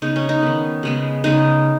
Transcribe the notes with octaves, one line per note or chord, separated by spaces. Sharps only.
C#3 B3 D#4
C#4
D#4
D#3 B3
C#3 G#3 B3
C#3 G#3 B3 D#4